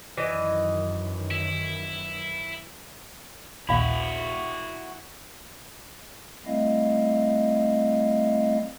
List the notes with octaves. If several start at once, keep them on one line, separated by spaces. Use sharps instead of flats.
F#2 D#3 E3 D#5
E4
A#1 D#2 A#2 E4 F#4 F5 B5
G3 A3 C4 E4 D#5 F5